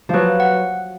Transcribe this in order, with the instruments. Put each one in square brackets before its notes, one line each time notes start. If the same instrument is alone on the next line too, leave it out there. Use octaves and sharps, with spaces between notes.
[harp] F3 F#3 [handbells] B4
[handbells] F#5